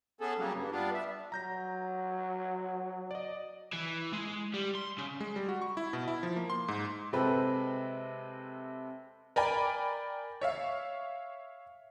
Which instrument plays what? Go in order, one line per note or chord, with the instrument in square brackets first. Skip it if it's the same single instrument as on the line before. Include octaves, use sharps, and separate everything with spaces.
[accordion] B3 C#4 G#4 A4
C#3 F#3 G3 A#3
G2
G3 B3 D4 F4
E5
[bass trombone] F#3 [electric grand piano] A#5 G6 A#6
[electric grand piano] D5 D#5
[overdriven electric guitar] E3
G#3
G3
C6
C#3
[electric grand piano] G#3
G3
F#4
C#6
E4
B2
E4
F3
A#3
C6
G#2
C6
[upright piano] C3 G#3 C4 A4 B4
[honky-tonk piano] A#4 D5 G5 G#5 B5
C#5 E5 F5